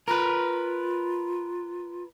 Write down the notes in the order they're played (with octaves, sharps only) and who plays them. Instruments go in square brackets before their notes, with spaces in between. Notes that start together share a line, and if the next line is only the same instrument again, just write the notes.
[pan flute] F4 [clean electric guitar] A#4 B4